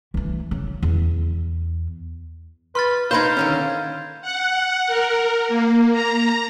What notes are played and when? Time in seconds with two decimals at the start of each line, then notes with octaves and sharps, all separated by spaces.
0.14 E3 A3
0.51 C#3
0.83 E2
2.75 B4 C6 F6 A6
3.11 D#4 B4 C5 F5 G6 G#6
3.37 D3 D#3 C#4
4.22 F#5
4.87 A#4
5.48 A#3
5.92 A#5